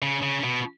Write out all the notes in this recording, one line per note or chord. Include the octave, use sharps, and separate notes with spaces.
C#3
C#3
B2